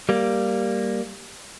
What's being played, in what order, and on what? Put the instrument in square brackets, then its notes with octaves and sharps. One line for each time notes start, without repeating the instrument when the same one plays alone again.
[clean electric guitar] G3 A#3